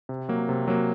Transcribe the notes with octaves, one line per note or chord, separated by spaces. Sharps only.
C3
F#3 A#3
C3
F#3 A#3